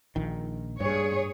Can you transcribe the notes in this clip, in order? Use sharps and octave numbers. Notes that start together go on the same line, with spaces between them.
A#1 D#3
G2 G#4 C#5